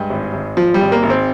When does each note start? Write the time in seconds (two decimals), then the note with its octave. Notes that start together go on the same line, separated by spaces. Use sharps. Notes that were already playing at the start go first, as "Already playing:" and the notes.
Already playing: G2 G#3
0.10 G#1
0.34 G#1
0.57 F3
0.74 G3
0.81 G#1
0.92 A#3
1.03 G#1
1.10 C4